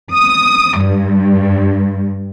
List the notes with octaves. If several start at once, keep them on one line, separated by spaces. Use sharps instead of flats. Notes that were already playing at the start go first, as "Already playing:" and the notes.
D#6
G2